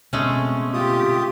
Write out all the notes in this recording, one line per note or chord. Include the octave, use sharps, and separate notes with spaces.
B2 D3 G#3 A3 C4 C#4
F4 G4 D#6